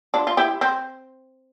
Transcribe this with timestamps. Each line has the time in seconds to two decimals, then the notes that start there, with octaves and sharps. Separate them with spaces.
0.14 D4 F4
0.27 F4
0.37 E4 G4
0.61 C4